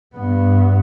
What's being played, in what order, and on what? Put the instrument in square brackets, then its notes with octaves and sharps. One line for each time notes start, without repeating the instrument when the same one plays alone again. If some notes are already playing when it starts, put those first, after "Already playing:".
[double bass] G2 B3